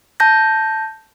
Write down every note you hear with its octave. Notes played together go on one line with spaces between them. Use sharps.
A5 G6 A#6